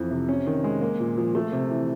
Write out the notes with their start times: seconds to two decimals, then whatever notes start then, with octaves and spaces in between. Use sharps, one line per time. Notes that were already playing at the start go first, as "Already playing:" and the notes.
Already playing: F2 E3
0.11 C3
0.28 C#4
0.46 D#3
0.64 G#3
0.81 A#3
1.00 A#2
1.17 F3
1.35 A3
1.52 C3
1.71 E3